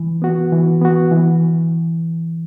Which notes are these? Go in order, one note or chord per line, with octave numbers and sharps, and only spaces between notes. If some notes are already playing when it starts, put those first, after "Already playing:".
Already playing: E3
B3 F#4
E3
B3 F#4
E3